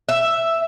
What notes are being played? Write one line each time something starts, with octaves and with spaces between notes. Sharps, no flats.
E5